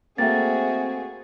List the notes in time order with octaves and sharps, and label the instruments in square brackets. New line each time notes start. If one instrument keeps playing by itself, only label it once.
[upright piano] A3 A#3 [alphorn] C4 [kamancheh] F#4 G#4 [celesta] E5 G5 A6